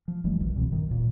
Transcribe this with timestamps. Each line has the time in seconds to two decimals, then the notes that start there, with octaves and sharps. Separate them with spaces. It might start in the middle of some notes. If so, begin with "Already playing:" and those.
0.08 F3
0.24 F#1 E3 G3 A3
0.40 E1 A#1 D#3
0.55 C2 B2 E3 C4
0.71 G#1 G2 D#3
0.88 D#1 A#2